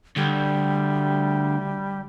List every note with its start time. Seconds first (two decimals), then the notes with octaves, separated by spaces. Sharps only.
0.16 D2 G3